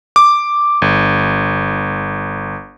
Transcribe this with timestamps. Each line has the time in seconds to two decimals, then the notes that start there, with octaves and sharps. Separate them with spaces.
0.16 D6
0.82 G1